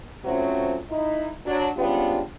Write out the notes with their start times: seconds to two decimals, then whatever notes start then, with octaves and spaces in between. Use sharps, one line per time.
0.25 F3 F#3 A3 C4 C#4
0.90 D#4 E4
1.45 F#3 D4
1.77 G#2 G3 B3 C#4 D4 F4